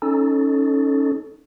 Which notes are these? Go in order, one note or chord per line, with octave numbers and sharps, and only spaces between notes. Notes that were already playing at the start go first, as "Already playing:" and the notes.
C#4 D#4 A4